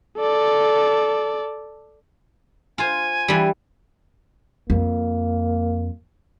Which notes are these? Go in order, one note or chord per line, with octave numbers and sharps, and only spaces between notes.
A4 D5
F4 C5 G#5
E3 G3
F2 A#3